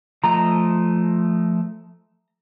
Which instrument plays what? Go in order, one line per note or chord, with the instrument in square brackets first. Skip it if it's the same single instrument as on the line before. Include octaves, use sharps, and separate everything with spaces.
[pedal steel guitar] F3 A3 D#5 [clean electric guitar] A#5